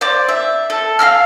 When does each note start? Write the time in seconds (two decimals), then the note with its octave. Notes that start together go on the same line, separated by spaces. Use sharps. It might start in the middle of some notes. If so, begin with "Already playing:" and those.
0.01 C5 D5 D6
0.29 E5
0.70 A4
0.99 F5 A5 E6 F6